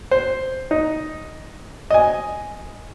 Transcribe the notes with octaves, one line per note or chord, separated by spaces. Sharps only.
C5
D#4
D#5 G#5